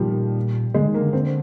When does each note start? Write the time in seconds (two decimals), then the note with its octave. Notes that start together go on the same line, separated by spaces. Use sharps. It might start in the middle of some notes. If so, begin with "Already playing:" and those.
Already playing: A#2 D#3 F3 G3
0.74 D3 G#3
0.88 D#3
0.94 A#3
1.00 D3
1.13 D3 C4